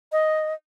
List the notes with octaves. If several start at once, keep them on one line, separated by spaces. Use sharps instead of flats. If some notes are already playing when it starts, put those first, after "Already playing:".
D#5